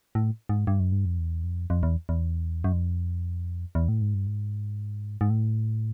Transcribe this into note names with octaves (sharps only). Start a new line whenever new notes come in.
A2
G#2
G2
F#2
G2
F2
E2
F2
F2
E2
E2
F#2
F2
E2
A2
G#2
G2
G#2
G#2
A2